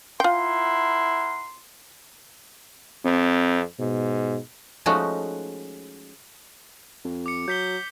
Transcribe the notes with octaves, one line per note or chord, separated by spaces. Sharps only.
E4 F4 A#4 F#5 G5 C6
F2 C4
G#2 B2
F3 G#3 A3 C#4 D#4 F#4
F2
D6 C#7
F#3 G6 B6 G7